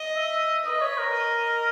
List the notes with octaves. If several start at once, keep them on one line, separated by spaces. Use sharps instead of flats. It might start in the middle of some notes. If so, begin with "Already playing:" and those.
Already playing: D#5
E5
B4 D#5
C#5
A#4
D#5